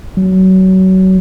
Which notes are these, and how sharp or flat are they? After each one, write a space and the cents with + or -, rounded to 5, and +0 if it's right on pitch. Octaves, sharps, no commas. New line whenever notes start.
F#3 +25